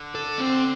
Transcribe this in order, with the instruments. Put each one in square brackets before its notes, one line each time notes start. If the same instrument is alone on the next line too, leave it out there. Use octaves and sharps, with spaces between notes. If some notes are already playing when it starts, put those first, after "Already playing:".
Already playing: [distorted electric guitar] D3
[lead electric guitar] A4
C4